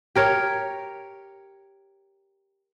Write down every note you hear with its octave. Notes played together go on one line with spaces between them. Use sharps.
G4 A#4 C#5